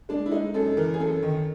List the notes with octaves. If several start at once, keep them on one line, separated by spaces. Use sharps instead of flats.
G#3 D4
E4
G#3 D#4
F#2 A4
E3 A#4
G#4
F#2 A4
D#3